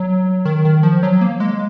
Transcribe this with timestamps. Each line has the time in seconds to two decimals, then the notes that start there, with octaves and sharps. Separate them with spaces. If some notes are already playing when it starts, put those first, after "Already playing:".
Already playing: F#3
0.45 D#3
0.65 D#3
0.83 F3
1.03 F#3
1.21 A#3
1.40 G#3